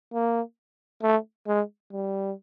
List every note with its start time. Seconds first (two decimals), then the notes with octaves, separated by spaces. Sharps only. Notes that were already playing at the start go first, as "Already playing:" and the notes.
0.14 A#3
1.03 A3
1.47 G#3
1.92 G3